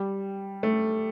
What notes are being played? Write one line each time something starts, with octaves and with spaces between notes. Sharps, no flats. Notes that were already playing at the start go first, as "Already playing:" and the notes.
Already playing: G3
A3